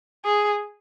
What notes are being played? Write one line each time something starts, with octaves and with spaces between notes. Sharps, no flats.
G#4